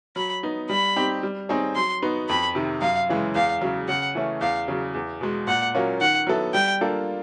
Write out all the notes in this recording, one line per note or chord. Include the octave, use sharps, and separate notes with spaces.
F#3 B5
B3 D#4
G3 B5
C4 D#4 G4
G3
C4 D#4 G#4 C#5
F#3 C6
B3 D#4 F#4 B4
F2 B5
C3 D#3
F#2 F5
C#3 E3 G#3
E2 F5
C#3 F#3
C#3 F#5
E3 A3 C#4
E2 F5
C#3 F#3
E2
B2 G#3
A#2 F#5
F#3 A#3 C#4 F4
D#3 F#5
F#3 B3 E4 A4
G3 G5
A#3 D4 F4 A4